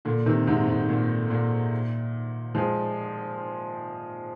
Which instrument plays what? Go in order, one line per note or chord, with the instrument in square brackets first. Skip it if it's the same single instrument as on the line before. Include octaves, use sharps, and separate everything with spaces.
[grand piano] A#2 D3
C3 D#3
G#2 C3
G#2
A#2
A#2
F3 G#3